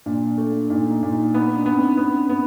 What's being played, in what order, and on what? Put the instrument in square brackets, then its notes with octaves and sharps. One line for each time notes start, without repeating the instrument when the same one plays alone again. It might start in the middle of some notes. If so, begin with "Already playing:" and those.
[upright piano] A#2 [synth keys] D4
[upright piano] A3
[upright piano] A#2 [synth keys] D#4
[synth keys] D#4
[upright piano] A#2
[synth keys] D#4
[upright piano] B3 [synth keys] D#4
[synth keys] D4
[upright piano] B3
[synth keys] C4
[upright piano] B3 [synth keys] C#4
[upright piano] B3